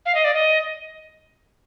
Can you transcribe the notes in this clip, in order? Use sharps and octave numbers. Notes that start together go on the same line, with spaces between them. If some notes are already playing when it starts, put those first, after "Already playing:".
F5
D#5
D5
D#5